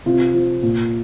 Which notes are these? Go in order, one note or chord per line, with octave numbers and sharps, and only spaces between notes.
C3 F4
F3
A#2